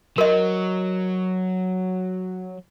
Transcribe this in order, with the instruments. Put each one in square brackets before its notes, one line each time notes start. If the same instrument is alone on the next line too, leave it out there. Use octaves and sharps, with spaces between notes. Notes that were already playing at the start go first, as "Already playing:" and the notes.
[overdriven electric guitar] F#3 [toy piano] A#4 D#5